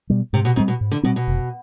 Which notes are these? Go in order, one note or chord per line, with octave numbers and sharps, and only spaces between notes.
B2 G3
G#2 C3
B2
G#2 G3 C4
B2
G#2
D3
B2 G3 C4
B2
F1